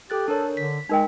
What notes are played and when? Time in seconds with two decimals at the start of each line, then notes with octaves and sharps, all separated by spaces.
0.10 G4 A4 F#6 A6
0.28 D4 A4 A#4 C#5
0.57 D3 B6
0.89 G#3 D#4 A#4 G5